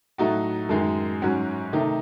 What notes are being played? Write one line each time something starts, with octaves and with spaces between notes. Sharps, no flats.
A2 F#3 A3 D#4 F#4
F#2 D#3 G#3 D#4
G#2 F#3 C#4 F#4
C3 D#3 A3 D#4